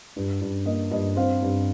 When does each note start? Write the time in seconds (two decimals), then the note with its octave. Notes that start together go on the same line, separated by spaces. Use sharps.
0.16 G2
0.41 G2
0.66 A#3 D#5
0.91 G2 D#5
1.16 C4 C5 F5
1.42 G2